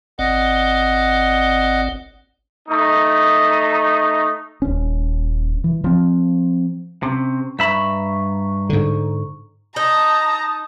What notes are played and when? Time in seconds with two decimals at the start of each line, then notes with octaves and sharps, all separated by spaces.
0.19 G#1 C4 D5 D#5 F#5
2.69 A3 D#4
4.62 D#1 C#4
5.64 E3
5.84 F3 C4
7.03 C3 C#4
7.59 G2 E5 A#5 B5 C#6
8.69 G#2 D3
9.76 D#4 A5 A#5 D#6